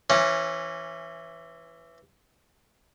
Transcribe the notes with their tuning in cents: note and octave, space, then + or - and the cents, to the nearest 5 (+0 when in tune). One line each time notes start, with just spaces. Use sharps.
E3 +10 C#4 -20